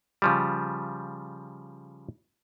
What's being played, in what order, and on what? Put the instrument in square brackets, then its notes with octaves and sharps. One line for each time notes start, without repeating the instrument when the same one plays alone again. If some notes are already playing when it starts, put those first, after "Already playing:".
[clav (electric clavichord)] C#3 F3 G3